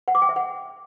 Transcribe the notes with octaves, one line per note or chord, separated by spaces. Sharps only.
F#5
D6
G5
E5
F#5